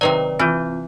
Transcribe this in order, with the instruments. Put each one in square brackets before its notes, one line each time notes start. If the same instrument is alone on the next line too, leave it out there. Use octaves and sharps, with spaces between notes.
[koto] C3 D#3 F#3 [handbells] B4 D5
[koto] E3 [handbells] C4 F4